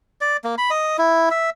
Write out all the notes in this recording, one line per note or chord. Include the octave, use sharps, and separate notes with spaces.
D5
A#3
B5
D#5
E4
E5